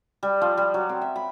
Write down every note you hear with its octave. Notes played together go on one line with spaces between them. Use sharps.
G3
F3
G3
F#3
C4
E5
B5